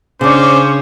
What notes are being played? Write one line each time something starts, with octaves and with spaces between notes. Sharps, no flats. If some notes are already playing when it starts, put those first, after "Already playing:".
C#3 C#4 D4 C5 C#5 D6